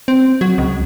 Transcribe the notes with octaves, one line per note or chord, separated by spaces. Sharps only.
C4
F#3
C#2